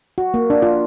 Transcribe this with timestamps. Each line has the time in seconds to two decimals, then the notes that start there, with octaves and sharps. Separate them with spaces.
0.18 F#4
0.34 A#3
0.50 D4
0.62 F4